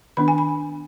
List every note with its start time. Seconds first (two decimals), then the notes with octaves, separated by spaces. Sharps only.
0.17 D#3 B3 D4 B5
0.28 G#5
0.38 B5